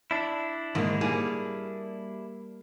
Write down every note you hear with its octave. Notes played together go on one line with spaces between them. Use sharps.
D4 E4
G#2 D3 D#3 A#3
G3 A#3 G#4